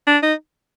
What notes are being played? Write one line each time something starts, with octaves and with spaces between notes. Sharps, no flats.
D4
D#4